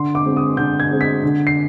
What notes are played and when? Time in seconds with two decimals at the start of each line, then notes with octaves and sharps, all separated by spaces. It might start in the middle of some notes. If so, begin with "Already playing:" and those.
Already playing: D3 C6
0.15 D6
0.25 G#3 C4
0.37 D#6
0.57 D3 G6
0.80 G#6
0.91 G#3 C4
1.01 B6
1.23 D3
1.47 C7